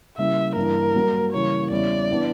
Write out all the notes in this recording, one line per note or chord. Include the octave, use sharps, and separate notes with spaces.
C#3 G3 A#3 E4 E5
G2 E3 A#3 D4 A#4
G2 F#3 A#3
C#3 E3 G3 A#3 C#5
E2 C#3 G3 C#4 E4 D5
E3 B3 D4